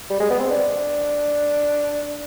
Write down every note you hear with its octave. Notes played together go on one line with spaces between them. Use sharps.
G3
G#3
B3
C4
D4